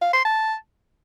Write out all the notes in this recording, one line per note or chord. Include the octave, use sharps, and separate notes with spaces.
F5
C6
A5